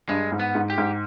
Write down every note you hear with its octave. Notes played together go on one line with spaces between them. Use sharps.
G2 G#3
G#2
B3
G#2
G4
G#2